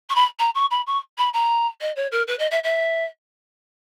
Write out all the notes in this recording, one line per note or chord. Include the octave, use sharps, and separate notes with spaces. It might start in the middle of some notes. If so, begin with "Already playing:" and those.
C#6
B5
A#5
C#6
B5
C#6
B5
A#5
D#5
C#5
A#4
B4
D#5
E5
E5